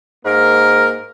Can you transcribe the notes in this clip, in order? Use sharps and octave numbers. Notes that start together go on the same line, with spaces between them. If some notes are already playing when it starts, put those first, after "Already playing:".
G#2 A#3 A#4